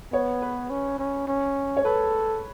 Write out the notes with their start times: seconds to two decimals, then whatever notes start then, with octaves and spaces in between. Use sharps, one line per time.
0.13 B3 C#5
0.42 B4
0.70 C#4
0.99 C#4
1.27 C#4
1.77 C#5
1.85 A4 B4